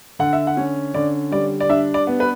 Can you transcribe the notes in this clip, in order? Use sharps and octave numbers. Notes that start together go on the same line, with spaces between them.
D3 F#5
E5
F#5
C#4
D3 D5
G3 D5
D5
D4 E5
D5
B3
B4